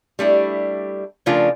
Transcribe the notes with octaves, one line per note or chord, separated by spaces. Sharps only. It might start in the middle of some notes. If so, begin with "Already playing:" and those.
G3 A3 D4 E4
C#3 F3 A3 D4 F4 A#4